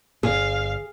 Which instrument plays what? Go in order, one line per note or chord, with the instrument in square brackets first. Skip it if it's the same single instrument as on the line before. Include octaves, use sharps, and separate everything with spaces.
[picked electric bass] G1 [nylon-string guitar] G#4 [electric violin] F5